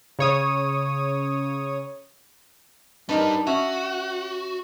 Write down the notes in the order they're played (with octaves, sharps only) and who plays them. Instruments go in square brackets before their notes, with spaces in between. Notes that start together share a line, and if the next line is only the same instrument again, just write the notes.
[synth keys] C#3 C#5 D#6
[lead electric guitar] G3 B4 [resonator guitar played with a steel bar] D4 D#4 A#4
[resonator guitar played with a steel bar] C#4 E5 [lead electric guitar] F#4